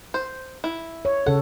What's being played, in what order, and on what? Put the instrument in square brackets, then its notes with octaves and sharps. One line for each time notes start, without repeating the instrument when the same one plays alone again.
[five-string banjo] C5
E4
[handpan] C#5
[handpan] C#3 A4 [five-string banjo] F#5